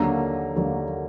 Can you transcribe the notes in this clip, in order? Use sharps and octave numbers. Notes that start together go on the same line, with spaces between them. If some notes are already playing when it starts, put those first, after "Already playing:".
Already playing: D#2 D3 F#3 A#3 D4 A#5
D#2 D3 F#3 A#3 D4